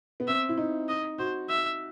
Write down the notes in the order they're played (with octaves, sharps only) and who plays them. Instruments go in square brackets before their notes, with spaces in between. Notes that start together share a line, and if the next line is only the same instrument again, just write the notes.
[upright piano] B3
[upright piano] C4 [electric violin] E5
[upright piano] E4
D#4
[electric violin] D#5
[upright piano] F#4 [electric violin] C5
[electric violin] E5